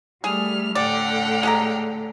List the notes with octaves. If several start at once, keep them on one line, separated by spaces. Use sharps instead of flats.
G3 A3 G#4 F6
A2 D3 D5 F#5 G5 F6
G#3 G4 A#5